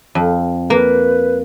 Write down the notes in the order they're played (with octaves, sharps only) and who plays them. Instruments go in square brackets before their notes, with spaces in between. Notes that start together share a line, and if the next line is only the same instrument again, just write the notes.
[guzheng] F2
[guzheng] A#3 [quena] B4